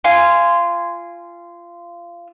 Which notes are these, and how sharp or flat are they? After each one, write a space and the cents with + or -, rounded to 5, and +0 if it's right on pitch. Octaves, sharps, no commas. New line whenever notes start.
F4 -20 G#5 +0